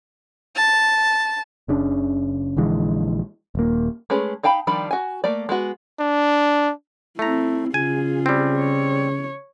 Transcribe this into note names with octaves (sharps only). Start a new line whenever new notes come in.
A5
F#1 C#3 D4
A#1 D3 E3 G#3
D#1 A#3
G#3 A3 C#4 G#4 B4
D#4 F5 G5 A5 B5
D#3 F3 G3 D4 B5
F#4 G#5
A3 A#3 D5
G#3 B3 F#4
D4
A3 C4 E4 A#5
C#3 F4 G#4 G#5
G3 C4
C#5